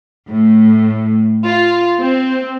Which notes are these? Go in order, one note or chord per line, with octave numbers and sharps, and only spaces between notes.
A2
F4
C4